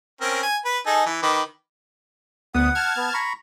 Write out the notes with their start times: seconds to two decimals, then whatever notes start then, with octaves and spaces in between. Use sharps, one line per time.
0.21 C4 C#4 A#4
0.43 G#5
0.65 B4
0.86 D#4 G#4 A4
1.06 E3
1.23 D#3 B4 D6
2.54 D2 B3 F#5 D#6
2.75 A5 F6 G#6
2.97 B3
3.14 A#5 B5 C#6